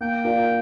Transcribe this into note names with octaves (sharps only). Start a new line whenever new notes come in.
A#3 G5
F4 A#4 D5 F5